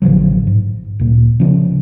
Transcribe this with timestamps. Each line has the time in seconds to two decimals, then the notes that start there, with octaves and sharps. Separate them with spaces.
0.02 A1 D3 F3 F#3
0.47 G#2
1.00 D1 A#2
1.40 C#3 F3 F#3 C#4